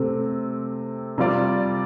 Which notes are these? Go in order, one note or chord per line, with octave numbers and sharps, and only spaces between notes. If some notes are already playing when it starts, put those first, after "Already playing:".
Already playing: C3 A3 C4
C3 G3 F4 D5